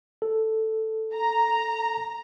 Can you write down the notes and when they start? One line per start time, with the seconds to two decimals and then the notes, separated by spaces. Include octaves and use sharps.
0.22 A4
1.14 A#5